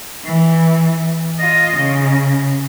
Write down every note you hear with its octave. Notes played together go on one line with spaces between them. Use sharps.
E3
F4 D#5
C#3